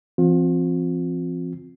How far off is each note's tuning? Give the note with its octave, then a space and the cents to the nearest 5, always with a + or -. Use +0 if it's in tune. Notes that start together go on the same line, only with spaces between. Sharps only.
E3 +45 C4 +0 F4 +35